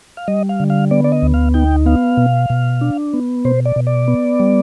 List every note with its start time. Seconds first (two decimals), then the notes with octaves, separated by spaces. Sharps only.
0.17 F5
0.28 G3 D#5
0.49 F5
0.60 D3
0.70 F5
0.91 B3 D5
1.04 D5
1.12 D#5
1.22 D2
1.34 F5
1.54 D#4 G5
1.86 B3 F5
2.17 B2
2.50 B2
2.81 D4
3.13 B3
3.45 B2 C5
3.65 D5
3.76 B2
3.87 D5
4.08 B3
4.40 G3